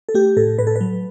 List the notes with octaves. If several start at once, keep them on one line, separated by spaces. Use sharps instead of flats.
A4
A3 G4
A2 A4
A2 B4
A4
B4
F#3